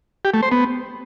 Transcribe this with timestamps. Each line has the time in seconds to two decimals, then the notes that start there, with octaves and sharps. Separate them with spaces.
0.25 G4
0.34 A3
0.43 C5
0.52 B3